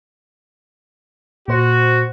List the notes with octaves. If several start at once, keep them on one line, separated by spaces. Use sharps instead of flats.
A#2 F#4 C5